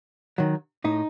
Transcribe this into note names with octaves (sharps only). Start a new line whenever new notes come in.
D#3 F#3
A2 D#4